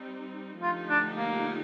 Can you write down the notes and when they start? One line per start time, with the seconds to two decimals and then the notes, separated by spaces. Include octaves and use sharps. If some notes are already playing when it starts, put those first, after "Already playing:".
Already playing: G3 C4 D#4
0.61 D3 F3 A3 D#4 F4 G4
0.90 D4
1.17 A#3